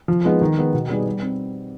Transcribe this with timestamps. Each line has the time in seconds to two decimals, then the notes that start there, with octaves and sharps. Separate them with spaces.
0.08 F3
0.25 G#3 B3 D#4
0.41 D#3
0.58 G#3 B3
0.74 B2
0.89 G3 B3 D#4 G#4
1.07 G3
1.22 C4